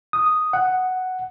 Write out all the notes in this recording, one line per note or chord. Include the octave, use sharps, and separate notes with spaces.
D#6
F#5